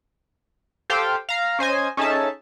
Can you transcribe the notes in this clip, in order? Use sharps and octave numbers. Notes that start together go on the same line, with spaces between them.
G4 A4 C5 F5 G5
F5 A#5
C#4 C5 D#5 G#5
C#4 D#4 G#4 A4 E5 A5